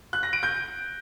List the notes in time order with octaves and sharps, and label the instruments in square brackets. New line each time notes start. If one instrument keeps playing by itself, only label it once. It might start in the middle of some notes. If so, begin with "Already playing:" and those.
[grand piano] F#6
A#6
D7
G6